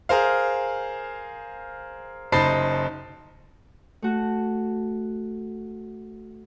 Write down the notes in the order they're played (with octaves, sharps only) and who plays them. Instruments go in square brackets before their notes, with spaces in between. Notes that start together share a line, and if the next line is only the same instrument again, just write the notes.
[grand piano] G#4 A#4 C5 F5
F#1 D#4 C5 A5 B5 C7
[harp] A3 F#4